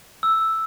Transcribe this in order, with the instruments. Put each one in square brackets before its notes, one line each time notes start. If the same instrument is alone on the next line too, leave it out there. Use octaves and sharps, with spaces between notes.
[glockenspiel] E6